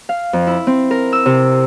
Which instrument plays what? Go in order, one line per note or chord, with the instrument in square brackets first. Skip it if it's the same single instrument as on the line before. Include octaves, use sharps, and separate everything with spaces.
[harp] F5
F2
E4
C4
A#4
E6
C3